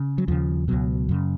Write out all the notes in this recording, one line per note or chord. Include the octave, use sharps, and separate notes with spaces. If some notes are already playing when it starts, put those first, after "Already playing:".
Already playing: C#3
F#3
D#2 C#3 F3
C#2 B2 F#3
F#2 C#3